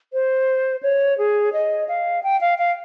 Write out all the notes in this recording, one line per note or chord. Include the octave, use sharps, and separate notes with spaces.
C5
C#5
G#4
D#5
F5
G5
F5
F5